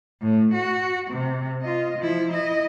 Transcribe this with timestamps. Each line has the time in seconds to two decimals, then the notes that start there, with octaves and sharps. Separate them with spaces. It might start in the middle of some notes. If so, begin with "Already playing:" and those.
0.22 A2
0.54 F#4
1.11 C3
1.62 F4 D#5
1.98 F3 E4
2.32 E4 D#5